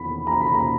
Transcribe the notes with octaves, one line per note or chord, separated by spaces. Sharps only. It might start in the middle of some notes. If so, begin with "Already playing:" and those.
Already playing: E2 D#3 B5
A#5
B5
A#5